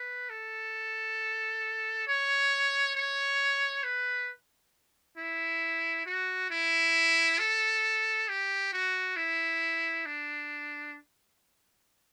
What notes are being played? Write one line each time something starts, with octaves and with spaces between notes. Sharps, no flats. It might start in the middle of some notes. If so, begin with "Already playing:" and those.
Already playing: B4
A4
C#5
C#5
B4
E4
F#4
E4
A4
G4
F#4
E4
D4